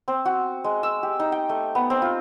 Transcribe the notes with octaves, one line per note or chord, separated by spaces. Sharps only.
C4
F#4
G#3
E6
G4
D#4
G5
A3
B3
C4
F4